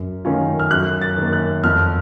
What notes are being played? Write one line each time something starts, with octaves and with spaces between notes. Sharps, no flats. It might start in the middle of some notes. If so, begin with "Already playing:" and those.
Already playing: F#2
D#3 A3 C#4 F4
F6
F#2 F#6
A6
D#3 A#3
F#6
F2 F6